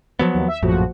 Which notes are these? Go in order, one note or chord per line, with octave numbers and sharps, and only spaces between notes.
F3 F#3 B3
D#2
E5
A#1 F#2 A2 F3 F#4